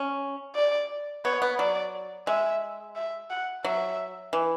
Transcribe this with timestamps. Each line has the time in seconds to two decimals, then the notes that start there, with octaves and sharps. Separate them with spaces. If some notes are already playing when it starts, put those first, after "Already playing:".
Already playing: C#4
0.55 D5
1.24 B3 C#5
1.42 B3
1.58 F#3 D5
2.27 G#3 E5
2.96 E5
3.30 F#5
3.64 F#3 E5
4.33 E3